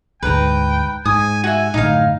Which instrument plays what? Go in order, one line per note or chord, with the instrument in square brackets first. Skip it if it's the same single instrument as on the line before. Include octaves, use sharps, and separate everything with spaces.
[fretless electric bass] D2 G#2 [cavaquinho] B4 A#5 [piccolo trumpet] G5
[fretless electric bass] G#2 [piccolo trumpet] G#5 [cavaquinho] D#6
[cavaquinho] F#4 E5 [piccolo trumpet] G#5
[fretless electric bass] F#2 A2 D3 [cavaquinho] D#4 F5